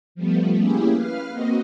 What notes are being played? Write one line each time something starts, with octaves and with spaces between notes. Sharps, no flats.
F3 G3 A3 B3
A#3 C#4 E4 G4 G#4
B4 F5 F6
A#3 C4 F#4 D#5